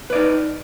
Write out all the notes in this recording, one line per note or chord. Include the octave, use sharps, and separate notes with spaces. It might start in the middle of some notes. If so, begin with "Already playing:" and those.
D#4 B4 D5